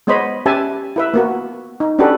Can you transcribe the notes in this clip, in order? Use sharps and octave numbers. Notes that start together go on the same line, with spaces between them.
G#3 B3 C5 C#5 D#5 B5
C#4 G4 B4 E5 G#5 A5
E4 B4 E5
A#3 B3 F#4
D#4
C#4 D4 F#4 G4 A4 B4